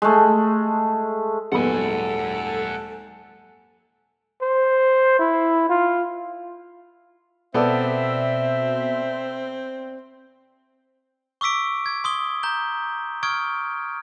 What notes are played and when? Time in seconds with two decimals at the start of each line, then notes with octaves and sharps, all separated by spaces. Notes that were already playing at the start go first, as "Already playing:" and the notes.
0.02 G#3 A3
1.52 D#1 G#2 F#3 G#3 B3 A4 F#5 G#5
4.42 C5
5.19 E4
5.70 F4
7.54 B2 B3 C4 A4 D5 E5
11.41 C#6 D6 E6 B6 D7
11.86 G#6
12.04 C6 D#6 G7
12.43 A#5 G6 G7
13.23 C#6 D#6 F6 G#6 D7